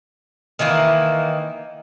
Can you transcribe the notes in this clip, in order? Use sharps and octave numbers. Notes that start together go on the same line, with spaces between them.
D#3 E3 A#3 E4